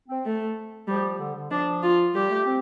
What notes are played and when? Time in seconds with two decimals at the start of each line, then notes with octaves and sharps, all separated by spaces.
0.09 C4
0.25 A3
0.87 F3 G3
1.19 D3
1.35 D3
1.51 F3 D4
1.83 F4
2.14 G3 G4
2.30 A3
2.46 C4